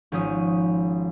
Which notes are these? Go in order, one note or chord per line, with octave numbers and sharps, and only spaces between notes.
G#1 F3 C#4 D#6